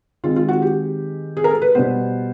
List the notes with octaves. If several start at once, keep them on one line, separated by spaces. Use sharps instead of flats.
D#3 G#3 C4 F4
F4
F#4
G4
G#4
A#4
A4
B4
B2 G3 B3 C5